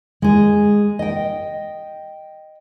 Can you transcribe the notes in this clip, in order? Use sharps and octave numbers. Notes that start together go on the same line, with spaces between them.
G#3 G#4
D#5 G5